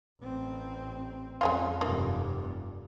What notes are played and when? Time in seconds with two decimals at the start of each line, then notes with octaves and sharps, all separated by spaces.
0.21 A1 C4
1.41 F2 G#3 C#4 F4
1.81 F1 G2 D3 E3 A#3